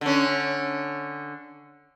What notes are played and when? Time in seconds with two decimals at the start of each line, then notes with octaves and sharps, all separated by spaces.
0.01 D3 C#4